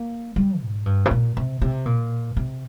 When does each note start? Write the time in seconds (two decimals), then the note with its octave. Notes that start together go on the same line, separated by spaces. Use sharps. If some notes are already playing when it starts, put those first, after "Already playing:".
Already playing: A#3
0.36 G3
0.62 G#2
0.86 G2
1.05 C3
1.11 A#2
1.37 C3
1.62 C3
1.86 A#2
2.37 C3